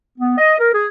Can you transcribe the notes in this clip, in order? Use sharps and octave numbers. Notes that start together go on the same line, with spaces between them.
B3
D#5
A#4
G#4